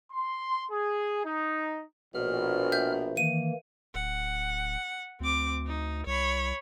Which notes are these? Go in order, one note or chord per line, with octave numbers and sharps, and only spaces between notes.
C6
G#4
D#4
A#1 B2 F6
E5 G6
D#3 E3 A#3 D#7
D1 F#5
D2 C4 D6
D#4
C2 C#5 B5